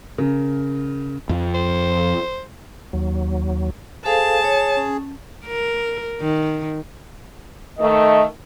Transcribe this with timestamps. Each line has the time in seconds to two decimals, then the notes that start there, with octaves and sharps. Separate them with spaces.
0.18 C#3 A#4
1.29 F2 F3
1.54 C5
2.93 D#2 F#3
4.05 G#4 A4 C5 F5 A5
4.44 C#5
4.77 C#4
5.46 A#4
6.21 D#3
7.79 D#3 A3 D#5